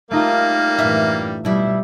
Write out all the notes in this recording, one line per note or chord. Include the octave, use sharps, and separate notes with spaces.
G3 A3 A#3 D#4 F4 A#4
F#2 A2 E3 E5
B2 G3 E4